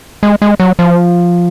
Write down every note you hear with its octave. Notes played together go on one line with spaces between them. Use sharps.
G#3
G#3
F#3
F3